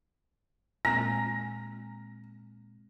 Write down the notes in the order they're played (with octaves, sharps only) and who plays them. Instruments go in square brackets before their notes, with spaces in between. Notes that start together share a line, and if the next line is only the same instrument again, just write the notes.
[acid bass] A#2 [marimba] G#3 C4 [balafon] G#5 A#5 [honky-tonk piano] A#6